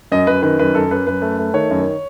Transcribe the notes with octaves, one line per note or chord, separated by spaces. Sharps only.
F#2 D#5
F#2 B4
D#3 B4
F#2 B4
F#2 A4
F#2 B4
F#2 B4
A3
A3
D#3 C#5
F#2